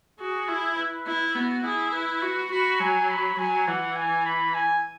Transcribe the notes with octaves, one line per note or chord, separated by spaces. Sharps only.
F#4 G#4
E4
B4
E4
B3 F#4
E4 G#4
B4
F#4
F#4 B5
F#3 G#5
B5
F#3 G#5
E3 F#5
G#5
B5
G#5